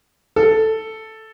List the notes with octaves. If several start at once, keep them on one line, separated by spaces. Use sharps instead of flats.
A4